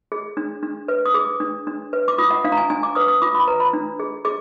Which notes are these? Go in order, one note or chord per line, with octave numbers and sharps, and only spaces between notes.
G#4
D4
D4
B4
D#6
G#4 D6
D4
D4
B4
D6
F4 D#6
F#5
D4 F5
A#5
G#5
D4 G#5
D6
B4 D#6
D#6
F4 D6
B5
B4 A#5
B5
D4
G#4
G#4 D6